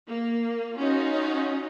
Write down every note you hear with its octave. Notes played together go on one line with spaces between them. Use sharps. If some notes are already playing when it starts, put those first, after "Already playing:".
A#3
C#4 D#4 F4 F#4